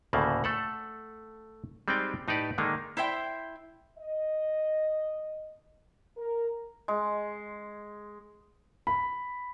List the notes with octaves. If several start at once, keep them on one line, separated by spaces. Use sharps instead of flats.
D2 A2 C#3 A3 A#3
A3 A4 F#5
G3 G#3 C4 D#4 D5 G5
A2 D#4 G4 B4 D5
D3 D#3 G#3 A#3 D4 D#4
E4 C5 E5 G5
D#5
A#4
G#3
B5